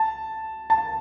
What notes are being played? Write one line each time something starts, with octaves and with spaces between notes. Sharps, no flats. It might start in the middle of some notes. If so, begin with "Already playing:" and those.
Already playing: A5
A5